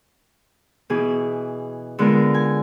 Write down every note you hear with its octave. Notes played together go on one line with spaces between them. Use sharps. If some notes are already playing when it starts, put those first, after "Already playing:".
B2 E3 G#4
D3 G#3 B3 F4 A#4
G#5